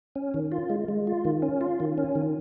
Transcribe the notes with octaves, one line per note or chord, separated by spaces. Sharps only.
C#4
D#3
F4
G#3
G#3
F4
D#3
C#4
F4
D#3
C#4
D#3